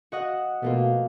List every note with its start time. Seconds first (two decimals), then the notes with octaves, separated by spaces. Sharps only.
0.12 F#4 D#5 F#5
0.62 B2 A3 A#3 F4